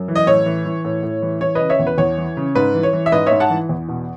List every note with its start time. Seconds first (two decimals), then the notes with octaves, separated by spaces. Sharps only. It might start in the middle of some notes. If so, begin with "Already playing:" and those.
Already playing: F#2
0.08 E3
0.16 D#5
0.27 A2 C#5
0.46 E3
0.66 E3
0.85 A2
1.03 A2
1.22 E3
1.41 E3 C#5
1.55 C#3 B4 D#5
1.70 C#5 E5
1.79 E2
1.87 B4
1.98 E2 C#5
2.17 E3
2.37 C#3
2.55 G#2 B4
2.75 E3
2.83 C#5
2.93 E3
3.06 E5
3.12 G#2 B4 D#5
3.26 G#2 C#5 E5
3.40 F#5 A5
3.50 E3
3.69 E2
3.88 B2